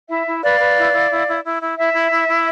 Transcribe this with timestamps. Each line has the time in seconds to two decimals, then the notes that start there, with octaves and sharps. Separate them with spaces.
0.09 E4 E5
0.27 E4
0.43 B4 D5 F5
0.60 B4
0.77 E4
0.93 E4
1.11 E4
1.28 E4
1.44 E4
1.61 E4
1.77 E4 E5
1.94 E4
2.10 E4
2.27 E4